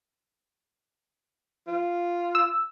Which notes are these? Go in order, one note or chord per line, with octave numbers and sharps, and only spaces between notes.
F4
E6